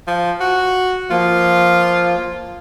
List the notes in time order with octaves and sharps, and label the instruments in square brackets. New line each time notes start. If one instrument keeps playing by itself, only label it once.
[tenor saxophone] F3
F#4
[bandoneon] F3 A#3 [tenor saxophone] F4